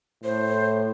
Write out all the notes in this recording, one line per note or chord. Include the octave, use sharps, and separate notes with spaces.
A2 C5